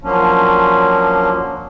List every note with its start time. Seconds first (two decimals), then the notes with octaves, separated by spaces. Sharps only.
0.03 F3 F#3 A#3 C#4 D4